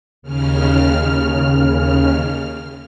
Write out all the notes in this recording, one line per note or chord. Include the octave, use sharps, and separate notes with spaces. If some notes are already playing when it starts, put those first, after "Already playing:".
D#2 C#3 F6